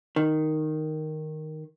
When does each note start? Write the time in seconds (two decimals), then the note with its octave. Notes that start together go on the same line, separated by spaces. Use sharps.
0.16 D#3